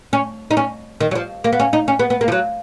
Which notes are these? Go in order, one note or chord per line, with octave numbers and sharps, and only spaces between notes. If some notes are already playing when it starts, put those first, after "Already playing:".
C#4
D#4
C#4
D#3
F#3
F3
A#3
B3
C#4
D#4
C#4
B3
B3
A#3
F3
F#3